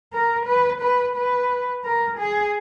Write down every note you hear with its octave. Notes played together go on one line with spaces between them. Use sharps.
A#4
B4
B4
B4
A#4
G#4